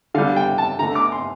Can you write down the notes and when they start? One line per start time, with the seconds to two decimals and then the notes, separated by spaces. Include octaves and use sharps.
0.14 D3 G3 F5
0.36 G5
0.58 A5
0.79 D3 A3 A#5
0.95 D6
1.12 C6